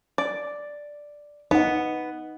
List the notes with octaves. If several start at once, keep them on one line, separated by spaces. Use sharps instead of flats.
D5
B3 D#4 F#5